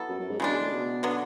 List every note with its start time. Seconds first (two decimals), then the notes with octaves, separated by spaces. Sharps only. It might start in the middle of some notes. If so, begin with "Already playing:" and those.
Already playing: F#3 B3 E4 A4
0.09 F#2
0.20 F#2
0.30 G#2
0.39 E2 C#3 G#3 D4
0.50 F#2
0.60 A2
0.72 B2
1.03 D3 F#3 B3